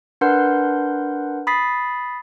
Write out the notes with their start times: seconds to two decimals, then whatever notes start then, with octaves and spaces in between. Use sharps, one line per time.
0.21 D4 A#4 B4 F#5 C6 G6
1.47 B5 D#6 A6 B6 C7